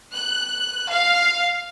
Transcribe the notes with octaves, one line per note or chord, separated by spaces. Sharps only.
F#6
F5